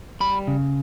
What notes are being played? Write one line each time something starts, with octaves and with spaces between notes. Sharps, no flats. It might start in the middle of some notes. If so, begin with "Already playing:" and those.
G3 B5
C#3